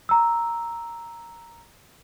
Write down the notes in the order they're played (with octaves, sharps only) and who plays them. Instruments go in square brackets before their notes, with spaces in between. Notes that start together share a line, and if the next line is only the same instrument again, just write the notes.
[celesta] A#5 E6